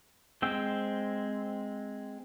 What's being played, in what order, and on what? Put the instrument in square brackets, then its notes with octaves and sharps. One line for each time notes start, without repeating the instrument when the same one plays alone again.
[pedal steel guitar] G#3 C4 G5 E6